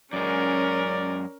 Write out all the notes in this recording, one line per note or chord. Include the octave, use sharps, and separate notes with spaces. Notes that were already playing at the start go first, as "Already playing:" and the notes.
F#2 G#3 C#4 A#4 D5